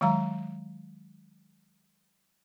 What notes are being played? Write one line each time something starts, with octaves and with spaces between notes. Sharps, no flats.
D#3 F#3 G#3 F5 A#5